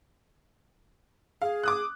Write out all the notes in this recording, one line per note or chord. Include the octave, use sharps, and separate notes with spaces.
G#4 F5
D6 D#6 F#6